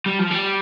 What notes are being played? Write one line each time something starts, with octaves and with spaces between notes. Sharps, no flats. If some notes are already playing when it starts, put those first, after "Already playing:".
G3
F3
G3